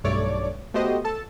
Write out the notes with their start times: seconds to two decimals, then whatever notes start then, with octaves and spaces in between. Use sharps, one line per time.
0.04 B1 G2 A3 C#5 D5 D6
0.74 A3 B3 F#4 G4 C5 D#5
1.05 A4 A5